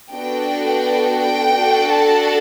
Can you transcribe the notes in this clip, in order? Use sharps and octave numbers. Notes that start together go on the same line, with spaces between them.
B3 D4 F#4 A4 G5
G5
D4 F#4 A4
A5